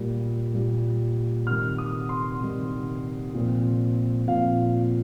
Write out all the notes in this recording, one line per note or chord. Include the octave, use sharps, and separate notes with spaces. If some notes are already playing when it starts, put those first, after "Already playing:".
Already playing: A#2 G3 A#3
A#2 G3 A#3
C3 D#3 G3 F6
D#6
C6
C3 D#3 G3
A#2 F3 C4
A#2 F3 C4 F5